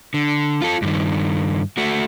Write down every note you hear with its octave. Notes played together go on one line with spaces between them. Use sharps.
D3
F4 A4
G2 D#3
A3 F#4